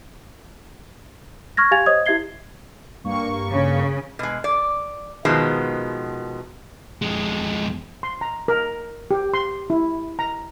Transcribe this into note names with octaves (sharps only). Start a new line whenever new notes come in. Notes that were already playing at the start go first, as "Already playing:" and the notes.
C#6 F6 G#6 A#6
G4 F5 G#5 G#6 A6 F7
C5 C#5 D#5 D#6 G#6
E4 G4 E5 G#6 C7 G7
G2 A#3 C#6
C#3
B2 G#3
D5
B2 D#3 F3 G#3 B3
F2 G#3
C6
A#5
A#4
G4
C6
E4
A#5